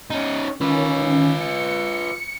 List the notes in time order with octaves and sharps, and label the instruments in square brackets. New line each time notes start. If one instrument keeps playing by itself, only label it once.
[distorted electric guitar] C#4 D#4
[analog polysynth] D#3 C#4 [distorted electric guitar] F4 B4
[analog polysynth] C#7